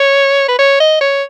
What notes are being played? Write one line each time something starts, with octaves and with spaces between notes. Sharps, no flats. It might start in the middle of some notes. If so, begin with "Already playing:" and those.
Already playing: C#5
B4
C#5
D#5
C#5